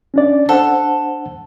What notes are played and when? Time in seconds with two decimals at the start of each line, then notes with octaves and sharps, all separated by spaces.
0.14 C#4 D4 D5
0.49 D4 A4 C5 F#5